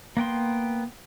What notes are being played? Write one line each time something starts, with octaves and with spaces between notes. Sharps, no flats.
A#3 B3 G5 C6